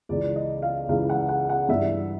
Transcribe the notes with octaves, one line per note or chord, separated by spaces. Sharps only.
C#2 C#3 E3 D5
D#5
F5
C#2 C#3 E3 F5
F#5
F#5
F#5
G2 E3 E5